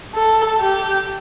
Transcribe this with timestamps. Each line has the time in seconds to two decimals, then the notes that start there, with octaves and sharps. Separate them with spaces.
0.15 A4
0.60 G4